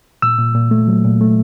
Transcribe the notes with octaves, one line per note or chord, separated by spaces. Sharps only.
A#2 E6
A#2
A#2
A3
F#3
A#2
A3